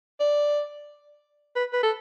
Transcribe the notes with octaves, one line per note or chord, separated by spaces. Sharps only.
D5
B4
B4
A4